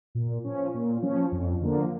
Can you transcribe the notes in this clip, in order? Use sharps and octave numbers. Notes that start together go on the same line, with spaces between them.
A#2
F3 C#4
A#2
F3 C#4
F2
D3 F3 A#3